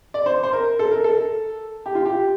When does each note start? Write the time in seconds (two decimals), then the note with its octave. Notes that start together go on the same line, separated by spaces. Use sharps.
0.14 D5
0.26 C5
0.43 C5
0.53 A#4
0.79 A4
0.91 A#4
1.04 A4
1.86 G4
1.95 F4
2.05 G4